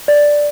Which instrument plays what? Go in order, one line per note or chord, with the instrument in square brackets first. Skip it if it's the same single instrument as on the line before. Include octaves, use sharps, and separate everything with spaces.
[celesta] D5